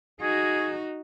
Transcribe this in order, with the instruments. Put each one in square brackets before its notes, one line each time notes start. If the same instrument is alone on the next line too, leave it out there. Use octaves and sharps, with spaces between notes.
[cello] D#4 F#4 [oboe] G#4